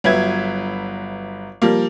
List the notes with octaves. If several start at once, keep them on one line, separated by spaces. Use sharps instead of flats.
G1 F#3 B4 E5 G#6
F3 G3 A#3